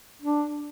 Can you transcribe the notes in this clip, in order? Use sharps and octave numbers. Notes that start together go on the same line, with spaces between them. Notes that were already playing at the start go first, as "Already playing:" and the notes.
D4